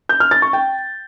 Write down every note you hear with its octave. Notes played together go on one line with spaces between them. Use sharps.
G6
F6
A6
C#6
G5